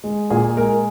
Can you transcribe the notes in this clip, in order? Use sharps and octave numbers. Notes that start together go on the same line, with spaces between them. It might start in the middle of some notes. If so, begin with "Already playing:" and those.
G#3
A#2 G#4
G#3 A#4